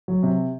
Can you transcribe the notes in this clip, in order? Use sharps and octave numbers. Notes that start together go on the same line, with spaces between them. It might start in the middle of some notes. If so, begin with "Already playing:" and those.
F#3
C3